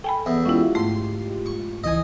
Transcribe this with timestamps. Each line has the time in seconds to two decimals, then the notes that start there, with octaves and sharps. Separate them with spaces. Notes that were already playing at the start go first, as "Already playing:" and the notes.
0.04 A4 G5 G#5 B5
0.26 E2
0.45 G#3 C#4 E4 F4 G4
0.75 G#2 A3 C6
1.46 C#6
1.84 C#2 E3 D#5 G#5 D#6